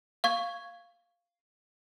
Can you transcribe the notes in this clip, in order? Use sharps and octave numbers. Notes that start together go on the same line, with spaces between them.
F5 C#6 G#6